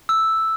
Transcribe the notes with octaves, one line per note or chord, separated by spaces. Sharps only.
E6